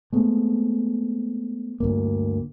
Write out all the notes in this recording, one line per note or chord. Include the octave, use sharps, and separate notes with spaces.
G#3 A3 B3 C4
D2 G2 A#3